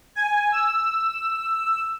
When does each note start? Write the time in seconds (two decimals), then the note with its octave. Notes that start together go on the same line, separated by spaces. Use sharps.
0.15 G#5
0.52 E6